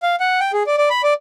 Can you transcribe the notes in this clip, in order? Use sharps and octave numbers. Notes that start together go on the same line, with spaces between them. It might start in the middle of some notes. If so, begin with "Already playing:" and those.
F5
F#5
G5
G#4
D5
D5
B5
D5